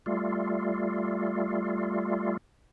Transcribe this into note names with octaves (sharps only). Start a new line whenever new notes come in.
G3 A3 F4